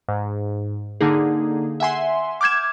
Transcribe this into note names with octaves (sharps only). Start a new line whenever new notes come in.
G#2
D3 A#3 D#4 G#4
E5 F#5 G#5 C6
D6 F6 G6 G#6 E7